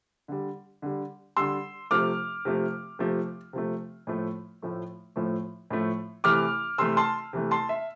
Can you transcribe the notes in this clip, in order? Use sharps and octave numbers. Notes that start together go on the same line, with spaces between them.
D3 G3
D3 G3
D3 G3 C6 E6
C3 F3 A3 D6 F6
C3 F3 A3
C3 F3 A3
C3 F3 A3
A2 F3 A3
A2 F3 A3
A2 F3 A3
A2 F3 A3
C3 E3 A3 D6 F6
C3 E3 A3 C6 E6
A5 C6
C3 E3 A3
A5 C6
E5